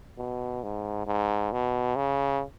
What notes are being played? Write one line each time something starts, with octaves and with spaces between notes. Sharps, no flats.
B2
G#2
G#2
B2
C#3